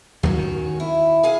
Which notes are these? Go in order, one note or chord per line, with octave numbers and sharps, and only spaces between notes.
D#2 A2 F#3 C#4 F#4
D#3
E4
G#4 F5 G#5